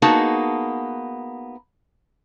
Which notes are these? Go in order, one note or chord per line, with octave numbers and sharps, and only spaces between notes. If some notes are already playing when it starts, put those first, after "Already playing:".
A#3 B3 D#4 F#4 G#4 A5